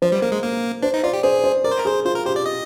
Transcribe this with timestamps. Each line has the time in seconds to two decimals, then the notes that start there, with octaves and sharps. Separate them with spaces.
0.02 F3 C5
0.12 G3
0.22 A#3 A#4
0.32 G#3
0.43 A#3 A#4
0.83 D4 C5
0.94 D#4
1.03 F4 D5
1.13 G4
1.23 G#4 C5
1.44 C5
1.64 A#4 D5
1.71 C5
1.79 A#4
1.85 G#4 C5
2.05 F4 C5
2.15 A#4
2.25 G4 C5
2.36 D5
2.46 D#5